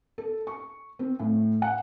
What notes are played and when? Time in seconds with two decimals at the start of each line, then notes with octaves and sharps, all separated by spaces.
0.18 A4
0.47 C#6
0.99 C4
1.20 A2
1.62 F#5